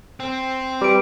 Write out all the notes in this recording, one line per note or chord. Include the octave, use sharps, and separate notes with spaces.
C4
G3 B4 D6 D7